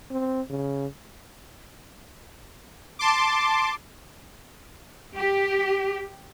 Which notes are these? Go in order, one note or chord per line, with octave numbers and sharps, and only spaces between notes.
C4
C#3
A5 C6 D6
G4